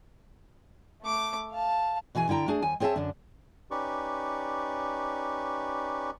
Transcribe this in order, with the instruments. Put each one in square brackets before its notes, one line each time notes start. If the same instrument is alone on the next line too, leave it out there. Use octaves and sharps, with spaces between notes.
[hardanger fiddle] A3 D6
F5 A5
[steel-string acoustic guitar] B2 E3 G#4 B4 G#5
D3 E4 G5 A#5
A3 D4 G#4
D#2 G#5
C4 G#4 C#5 D#5 E5 A5
F#2 D3 D4
[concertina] C#4 D#4 G4 B4 D5 C#6